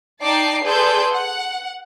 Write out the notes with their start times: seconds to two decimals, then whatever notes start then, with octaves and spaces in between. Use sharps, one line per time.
0.21 D#4 D5 G5 A5 D6 C7
0.64 G#4 A4 B4 D5 C6 G6
1.14 F#5